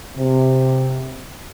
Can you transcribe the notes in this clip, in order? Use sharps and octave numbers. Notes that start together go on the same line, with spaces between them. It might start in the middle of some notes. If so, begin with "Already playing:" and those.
C3